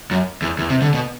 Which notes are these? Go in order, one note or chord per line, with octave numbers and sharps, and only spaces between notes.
F#2
E2
E2
C3
D3
B2